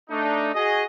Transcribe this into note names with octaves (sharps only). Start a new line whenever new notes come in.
A3 D4 D#4
F#4 G#4 D#5